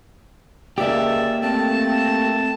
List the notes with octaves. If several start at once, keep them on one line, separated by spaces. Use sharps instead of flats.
C#2 A#3 G4 D5 E5
A3 C4 A5